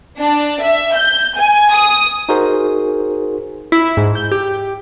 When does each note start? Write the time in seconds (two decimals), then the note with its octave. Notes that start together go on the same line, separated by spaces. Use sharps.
0.20 D4
0.62 E5
0.96 G6
1.38 G#5
1.74 D#6
2.29 D#4 F#4 G#4 A#4 C5
3.72 E4
3.97 G#2
4.15 G6
4.32 G4